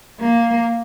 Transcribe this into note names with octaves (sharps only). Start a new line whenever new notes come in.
A#3